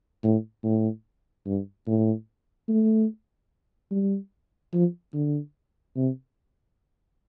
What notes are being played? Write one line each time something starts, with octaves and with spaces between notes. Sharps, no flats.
A2
A2
G2
A2
A3
G3
F3
D3
C3